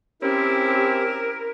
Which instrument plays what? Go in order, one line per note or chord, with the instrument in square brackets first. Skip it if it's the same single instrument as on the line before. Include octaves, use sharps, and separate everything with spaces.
[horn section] C4 C#4 [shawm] E4 [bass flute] G4 [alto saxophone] A#4